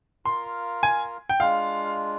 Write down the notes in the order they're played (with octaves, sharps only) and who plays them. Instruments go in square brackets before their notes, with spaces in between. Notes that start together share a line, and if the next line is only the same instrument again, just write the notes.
[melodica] F4 A#4 F5 [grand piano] C6
[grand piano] G#5
G5
[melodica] G#3 D4 F4 [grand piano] F5